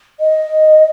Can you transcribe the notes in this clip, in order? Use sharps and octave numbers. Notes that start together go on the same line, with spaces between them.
D#5